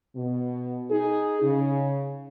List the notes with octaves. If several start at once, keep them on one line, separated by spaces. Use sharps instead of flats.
B2
D#4 G#4
C#3